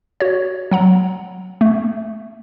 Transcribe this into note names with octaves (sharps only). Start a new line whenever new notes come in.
F#4 C#5
F#3 F#5 A#5
A3